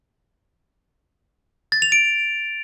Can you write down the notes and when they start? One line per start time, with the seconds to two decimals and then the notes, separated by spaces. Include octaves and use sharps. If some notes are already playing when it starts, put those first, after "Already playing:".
1.72 A6
1.82 F7
1.92 D7